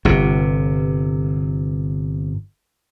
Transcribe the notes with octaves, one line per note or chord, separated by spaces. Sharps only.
G1 C3